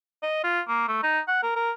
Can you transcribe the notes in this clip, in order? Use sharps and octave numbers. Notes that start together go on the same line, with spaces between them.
D#5
F4
A#3
A3
D#4
F#5
A#4
A#4